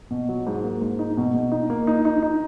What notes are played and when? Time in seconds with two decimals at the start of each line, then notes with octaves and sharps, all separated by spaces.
0.11 B2
0.29 F#3
0.47 G#2
0.64 A#3
0.82 G#2
0.99 D#4
1.17 B2
1.34 B2
1.52 D#4
1.70 A#3
1.87 D#4
2.05 D#4
2.23 D#4